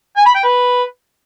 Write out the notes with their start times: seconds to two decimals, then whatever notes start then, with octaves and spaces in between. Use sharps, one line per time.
0.17 G#5
0.26 B5
0.35 G5
0.44 B4